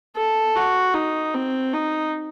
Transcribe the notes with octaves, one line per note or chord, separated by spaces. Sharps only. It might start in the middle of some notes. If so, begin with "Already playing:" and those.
A4
F#4
D#4
C4
D#4